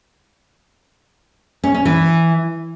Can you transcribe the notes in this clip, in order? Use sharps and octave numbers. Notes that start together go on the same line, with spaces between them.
C#4
C#4
E3